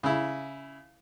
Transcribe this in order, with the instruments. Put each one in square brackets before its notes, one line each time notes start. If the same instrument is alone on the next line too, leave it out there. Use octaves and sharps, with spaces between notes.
[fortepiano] C#3 E4